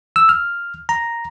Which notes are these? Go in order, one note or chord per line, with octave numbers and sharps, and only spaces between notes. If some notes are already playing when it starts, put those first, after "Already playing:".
E6
F6
A#5